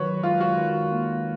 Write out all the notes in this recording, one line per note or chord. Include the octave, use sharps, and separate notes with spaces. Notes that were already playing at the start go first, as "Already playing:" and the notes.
Already playing: D#3 F#3 F#4 B4 C#5
G#3 F4
F#4
D#3
A#3